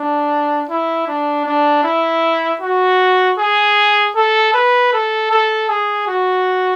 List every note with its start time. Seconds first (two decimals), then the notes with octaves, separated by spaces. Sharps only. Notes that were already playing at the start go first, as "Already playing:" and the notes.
Already playing: D4
0.69 E4
1.08 D4
1.45 D4
1.83 E4
2.61 F#4
3.38 G#4
4.15 A4
4.54 B4
4.92 A4
5.31 A4
5.69 G#4
6.07 F#4